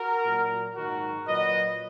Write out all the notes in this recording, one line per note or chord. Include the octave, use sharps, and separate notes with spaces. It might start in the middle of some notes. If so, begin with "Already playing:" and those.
Already playing: F#4 A#4
A#2 F#3
G#2 D#3 F#3 F#4 A#4
A#2 F#3 B4 D#5